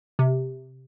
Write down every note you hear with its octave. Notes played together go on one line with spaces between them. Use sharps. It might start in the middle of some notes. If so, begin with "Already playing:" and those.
C3